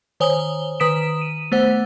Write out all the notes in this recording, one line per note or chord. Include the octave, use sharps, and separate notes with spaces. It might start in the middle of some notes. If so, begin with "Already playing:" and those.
D#3 C5 C#5 G#5 D#6 G7
D#3 B4 D#6 B6 D7 E7
D#7
A3 B3 C5 F#5